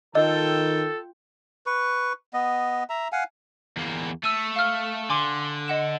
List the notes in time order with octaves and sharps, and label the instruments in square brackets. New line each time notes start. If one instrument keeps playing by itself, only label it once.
[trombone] D#3 [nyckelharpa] F4 G5 [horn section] A4 [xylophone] D#5
[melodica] B4 C#6
B3 D#5
E5 A#5
F5 F#5 G#5
[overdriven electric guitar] E2 A#3
[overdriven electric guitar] A3 [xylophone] E6 D#7
[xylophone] F5 F6
[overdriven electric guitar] D3 [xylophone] G#5 C6 D6
[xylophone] D#5 F#5 E7